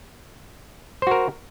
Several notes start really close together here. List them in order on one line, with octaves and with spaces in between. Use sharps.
C5 F#4 A#4